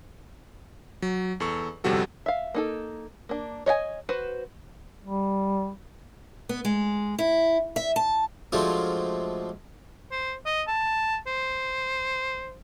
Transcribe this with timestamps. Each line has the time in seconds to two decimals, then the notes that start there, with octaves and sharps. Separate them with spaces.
1.02 F#3
1.40 E2 A4 C#6
1.84 G1 F2 C3 G3 F#4 A4
2.26 E5 F5
2.54 A#3 D#4 A4
3.29 A#3 D4
3.66 C#5 D#5 E5 G#5
4.09 F#4 B4 C5
5.04 G3
6.49 B3
6.65 G#3
7.18 E4
7.76 E5
7.96 A5
8.52 F3 F#3 G#3 A3 D4 F4
10.11 C5
10.46 D#5
10.67 A5
11.27 C5